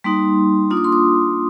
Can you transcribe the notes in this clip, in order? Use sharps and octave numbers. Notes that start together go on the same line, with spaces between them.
G3 A#3 D#4 C6
A#3 D4 F4 D#6
D6
C6
D6